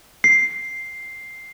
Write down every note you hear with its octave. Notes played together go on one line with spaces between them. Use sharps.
C7